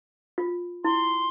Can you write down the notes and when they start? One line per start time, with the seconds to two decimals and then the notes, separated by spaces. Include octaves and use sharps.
0.38 F4
0.84 E4 C6